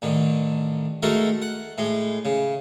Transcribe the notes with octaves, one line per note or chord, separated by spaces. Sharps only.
A1 D3 D#3
G#3 A3 D#4 F#4 A4 A#4
F#5
A2 G#3
C#3